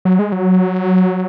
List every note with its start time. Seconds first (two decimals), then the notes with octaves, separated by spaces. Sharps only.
0.05 F#3
0.19 G#3
0.32 F#3